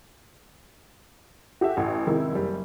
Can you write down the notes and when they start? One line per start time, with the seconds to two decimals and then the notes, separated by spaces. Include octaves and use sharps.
1.61 F#4 G4 A4 E5
1.77 A1
2.07 C3 D#3 G#3 E4
2.32 F#1 G3